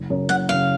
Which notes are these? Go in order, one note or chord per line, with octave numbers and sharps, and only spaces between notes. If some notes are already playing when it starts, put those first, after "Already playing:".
Already playing: F#1
F#2 C#3
F#1 F#5
F#2 C#3 F5